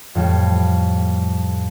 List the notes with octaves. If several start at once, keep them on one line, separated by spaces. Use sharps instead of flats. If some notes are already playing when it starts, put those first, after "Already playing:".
F2 A2 G3 A3